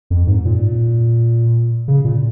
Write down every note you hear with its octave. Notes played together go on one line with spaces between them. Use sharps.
F2
G#2
A#2
C#3
A#2